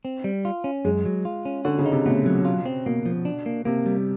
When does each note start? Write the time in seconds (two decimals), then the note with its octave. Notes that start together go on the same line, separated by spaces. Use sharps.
0.05 C4
0.24 G3
0.45 F4
0.64 C#4
0.85 F#2 G#3
1.05 F#3
1.25 F4
1.45 C#4
1.65 D3 F#4
1.78 C#3
1.86 D#4
1.92 C3
2.05 B2 A3
2.26 F#3
2.45 F4
2.66 C4
2.86 B2 A#3
3.06 F3
3.25 D4
3.46 A#3
3.65 C3 A#3
3.86 G3